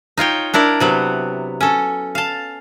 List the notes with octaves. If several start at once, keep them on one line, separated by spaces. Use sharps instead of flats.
D#4 F4 C#5 G5
D4 E4 A#4 D5
C3 F#3 B3
C#4 A4
F5 A5